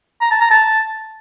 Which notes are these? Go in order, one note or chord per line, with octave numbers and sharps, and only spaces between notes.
A#5
A5
A#5
A5